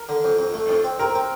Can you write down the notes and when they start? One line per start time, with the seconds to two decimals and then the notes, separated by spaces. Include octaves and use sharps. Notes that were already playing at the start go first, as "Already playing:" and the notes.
Already playing: A#4
0.09 D3
0.24 F2
0.39 F2
0.54 A3
0.69 F2
0.84 C4
0.99 C4 A#4
1.15 C4